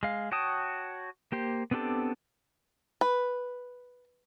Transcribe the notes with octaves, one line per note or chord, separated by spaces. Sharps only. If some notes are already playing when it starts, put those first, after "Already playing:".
G#3 F5
F#4 C#5 G5 A5 D#6
A#3 G4 C5
B3 C4 D4 G4 A4
B4